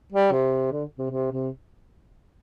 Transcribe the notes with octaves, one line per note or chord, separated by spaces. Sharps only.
G3
C3
D3
C3
C3
C3